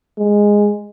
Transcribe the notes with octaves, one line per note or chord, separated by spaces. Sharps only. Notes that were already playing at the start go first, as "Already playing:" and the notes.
G#3